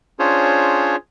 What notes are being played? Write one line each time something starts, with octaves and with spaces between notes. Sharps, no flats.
C#4 D4 F4 G#4 C5 C#5